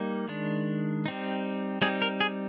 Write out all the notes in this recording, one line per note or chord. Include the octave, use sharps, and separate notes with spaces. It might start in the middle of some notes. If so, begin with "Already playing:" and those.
Already playing: G3 A#3 D#4
D#3 G#3 D4
G3 C4 D#4
G3 C4 D#4 G#4
A#4
G#4